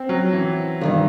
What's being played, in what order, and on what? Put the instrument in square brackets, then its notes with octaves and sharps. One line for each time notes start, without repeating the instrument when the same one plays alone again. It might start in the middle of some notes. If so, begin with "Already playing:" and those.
Already playing: [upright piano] C4
F#3
E3
[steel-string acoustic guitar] G2 D#3 G3